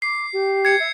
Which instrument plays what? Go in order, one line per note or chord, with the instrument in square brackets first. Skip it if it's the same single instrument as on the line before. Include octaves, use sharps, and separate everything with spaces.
[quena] D6 [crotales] C7
[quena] G4
[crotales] G#6 C#7
[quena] E5